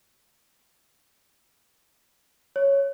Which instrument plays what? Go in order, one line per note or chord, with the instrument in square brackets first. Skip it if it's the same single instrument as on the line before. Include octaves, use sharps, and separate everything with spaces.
[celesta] C#5